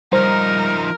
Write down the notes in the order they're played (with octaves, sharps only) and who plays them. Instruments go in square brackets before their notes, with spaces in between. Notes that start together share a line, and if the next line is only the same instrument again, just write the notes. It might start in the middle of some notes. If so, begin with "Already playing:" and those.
[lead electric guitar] F3 D#4 [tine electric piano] G3 [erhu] A#4 [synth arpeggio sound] C5